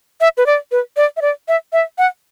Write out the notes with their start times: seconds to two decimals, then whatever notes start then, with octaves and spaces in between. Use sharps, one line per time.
0.21 E5
0.38 B4
0.46 D5
0.72 B4
0.97 D5
1.17 E5
1.22 D5
1.48 E5
1.73 E5
1.98 F#5